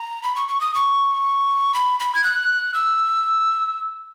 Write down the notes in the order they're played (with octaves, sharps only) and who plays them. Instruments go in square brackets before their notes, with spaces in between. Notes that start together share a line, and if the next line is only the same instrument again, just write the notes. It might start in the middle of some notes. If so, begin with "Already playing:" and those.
Already playing: [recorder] A#5
B5
C#6
C#6
D#6
C#6
B5
B5
G#6
F#6
E6